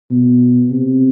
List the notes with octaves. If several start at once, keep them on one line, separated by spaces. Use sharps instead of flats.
B2
C3